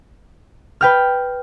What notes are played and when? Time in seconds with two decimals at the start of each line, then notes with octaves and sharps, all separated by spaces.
0.81 B4 G5 F6